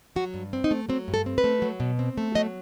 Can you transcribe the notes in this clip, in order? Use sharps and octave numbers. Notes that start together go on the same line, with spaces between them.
F#3 F#4
G2
C4
D#4
A3
F#3 C4
G2
A4
C4
B4
A3
F#3
B2
C4
A3
F#3 D#5